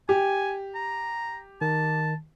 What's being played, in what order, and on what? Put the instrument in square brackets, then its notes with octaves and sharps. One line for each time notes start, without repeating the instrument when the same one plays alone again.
[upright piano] G4 [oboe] G#5
[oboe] A#5
[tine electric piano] D#3 [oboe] A5